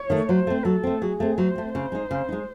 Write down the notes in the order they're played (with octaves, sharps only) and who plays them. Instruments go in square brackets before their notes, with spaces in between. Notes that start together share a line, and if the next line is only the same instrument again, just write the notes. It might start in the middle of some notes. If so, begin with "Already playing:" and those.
Already playing: [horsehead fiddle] C#5
[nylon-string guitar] D#3 A3
[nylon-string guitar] F#3 [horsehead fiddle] C5
[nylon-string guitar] A3 C4
[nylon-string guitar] F#3 [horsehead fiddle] A4
[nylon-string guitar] A3 C4
[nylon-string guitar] F#3 [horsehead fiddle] G#4
[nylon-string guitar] A3 C4
[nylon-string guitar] F#3 [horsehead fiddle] C5
[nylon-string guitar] A3 C4
[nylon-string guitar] C#3 [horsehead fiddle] C5
[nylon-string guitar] G#3 D#4
C#3
G#3 D#4